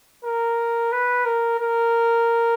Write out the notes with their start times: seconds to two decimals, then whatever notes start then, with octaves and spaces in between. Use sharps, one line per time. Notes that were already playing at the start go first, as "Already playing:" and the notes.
0.25 A#4
0.92 B4
1.25 A#4
1.59 A#4